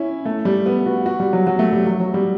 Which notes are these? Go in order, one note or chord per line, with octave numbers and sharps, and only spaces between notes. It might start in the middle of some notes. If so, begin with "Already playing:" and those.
Already playing: C#4 E4
A3
G3
B3
F#4
F#4
G3
F#3
F#3
A3
G3
F#3
F#3
G3